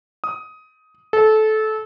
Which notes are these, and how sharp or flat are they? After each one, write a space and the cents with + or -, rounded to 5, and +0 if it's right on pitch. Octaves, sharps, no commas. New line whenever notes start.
D#6 +15
A4 -20